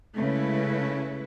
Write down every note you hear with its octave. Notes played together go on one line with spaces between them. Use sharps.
C#3 G#3 A3 C#4 E4 B4